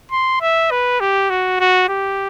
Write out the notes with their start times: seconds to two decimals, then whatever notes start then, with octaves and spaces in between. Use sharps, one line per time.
0.12 C6
0.41 E5
0.71 B4
1.00 G4
1.30 F#4
1.60 F#4
1.89 G4